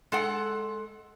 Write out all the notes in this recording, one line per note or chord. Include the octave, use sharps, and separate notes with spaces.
G#3 A4 F#5